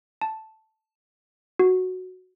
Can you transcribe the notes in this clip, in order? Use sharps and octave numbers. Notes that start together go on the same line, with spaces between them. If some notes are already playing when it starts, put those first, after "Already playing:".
A5
F#4